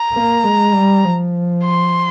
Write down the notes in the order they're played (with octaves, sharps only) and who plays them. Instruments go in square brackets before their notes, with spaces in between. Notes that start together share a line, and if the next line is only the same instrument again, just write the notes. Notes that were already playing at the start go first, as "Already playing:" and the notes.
Already playing: [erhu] A#5
[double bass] A#3
G#3
G3
F3
[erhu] C6